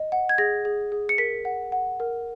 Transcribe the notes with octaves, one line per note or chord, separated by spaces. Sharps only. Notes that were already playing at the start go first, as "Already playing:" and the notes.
Already playing: D#5
F#5
G#6
G#4 A#6
G#4
G#4
C#7
A#4 B6
F#5
F#5
A#4